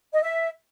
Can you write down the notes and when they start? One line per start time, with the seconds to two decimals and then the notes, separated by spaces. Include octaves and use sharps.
0.13 D#5
0.22 E5